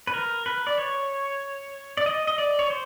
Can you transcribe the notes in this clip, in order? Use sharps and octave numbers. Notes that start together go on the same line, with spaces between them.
B4
A#4
B4
D5
C#5
D5
D#5
D#5
D5
C#5
C5